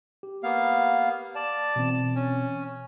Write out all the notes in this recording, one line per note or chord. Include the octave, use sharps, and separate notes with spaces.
G4
A#3 B3 F5
D5 A5
B2 E3 C4
C#4